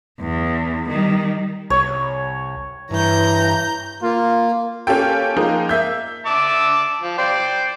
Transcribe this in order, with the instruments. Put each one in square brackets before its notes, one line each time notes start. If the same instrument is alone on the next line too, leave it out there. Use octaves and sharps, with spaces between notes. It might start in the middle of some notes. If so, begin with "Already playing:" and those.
[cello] E2
D#3 G3
[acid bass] C2 [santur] C#5
[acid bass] G2 [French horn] E3 [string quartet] A#5 G6
[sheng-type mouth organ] A#3 [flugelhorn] F4
[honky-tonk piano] A#3 C#4 F4 G4 A4 G5
F3 G#3 A#3 D#4
A#3 E5 G6
[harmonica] E5 A5 D6
F3
C5 D5 G5